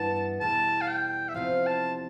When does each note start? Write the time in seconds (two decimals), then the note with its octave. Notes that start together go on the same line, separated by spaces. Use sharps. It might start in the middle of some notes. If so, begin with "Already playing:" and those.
Already playing: G2 E3 B3 A5
0.40 E2 B2 G3 A5
0.81 F5
0.88 G5
1.29 E5
1.34 E2 C3 F3 F5
1.66 A5